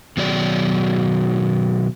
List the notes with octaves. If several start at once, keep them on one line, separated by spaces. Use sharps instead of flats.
B2 D#3 F#3 G#4 D5